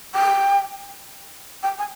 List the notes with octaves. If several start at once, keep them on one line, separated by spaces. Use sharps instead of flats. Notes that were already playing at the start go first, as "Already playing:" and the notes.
G5
G5
G#5